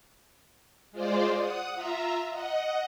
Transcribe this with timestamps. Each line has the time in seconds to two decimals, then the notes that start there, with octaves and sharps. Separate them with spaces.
0.92 G#3 F4 C5 D5
1.38 F#5 D#6
1.75 F4 E5 A#5
2.30 D#5 F#5